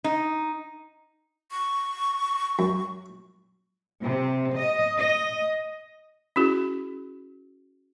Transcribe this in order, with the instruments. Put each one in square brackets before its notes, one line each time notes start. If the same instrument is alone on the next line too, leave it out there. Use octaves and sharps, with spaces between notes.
[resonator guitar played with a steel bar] D#4
[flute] C#6
[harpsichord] F#2
[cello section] C3
D#5
D#5
[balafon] C#4 E4 F#4 G#4